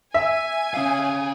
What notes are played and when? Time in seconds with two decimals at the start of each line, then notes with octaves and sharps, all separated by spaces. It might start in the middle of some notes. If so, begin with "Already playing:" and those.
0.14 E5 G#5
0.74 C#4 F5